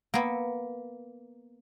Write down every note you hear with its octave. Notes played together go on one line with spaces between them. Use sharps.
A#3 B3